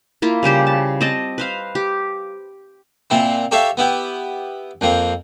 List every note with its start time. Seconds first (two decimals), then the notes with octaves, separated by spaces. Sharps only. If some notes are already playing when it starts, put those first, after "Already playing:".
0.22 A#3 E4 F4
0.43 C#3 G3 G4 C5
0.67 A5
1.01 C4 D#5 A5
1.38 B4 C5 F5
1.75 G4
3.10 A#2 C4 E4
3.51 G4 A4 C#5 E5 F5
3.77 B3 E4 G4
4.81 F2 A#3 C4